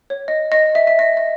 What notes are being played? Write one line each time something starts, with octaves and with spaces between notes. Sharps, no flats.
C#5
D#5
D#5
E5
E5
D#5
D#5